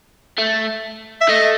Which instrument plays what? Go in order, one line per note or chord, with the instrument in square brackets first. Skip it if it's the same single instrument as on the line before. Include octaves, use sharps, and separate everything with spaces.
[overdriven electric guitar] A3
[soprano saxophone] E5
[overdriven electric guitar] A3 [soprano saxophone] D#5